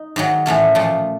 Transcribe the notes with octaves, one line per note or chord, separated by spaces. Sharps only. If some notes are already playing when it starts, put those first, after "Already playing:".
Already playing: D#4
G#2 D#3 F#3
A2 E3 A3 C#4
A#2 F3 A3